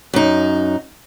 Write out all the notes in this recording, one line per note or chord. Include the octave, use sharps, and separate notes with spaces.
F#2 D#4